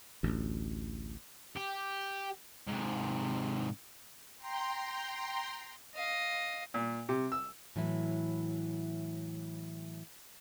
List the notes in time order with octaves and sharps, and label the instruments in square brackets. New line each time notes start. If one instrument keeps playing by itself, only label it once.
[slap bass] A1 D2
[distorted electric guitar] G4
G#2 C3
[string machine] G5 A#5 C6
[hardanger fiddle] D#5 F5
[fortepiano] A#2
C3
E6
[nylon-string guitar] A2 E3 F#3 E4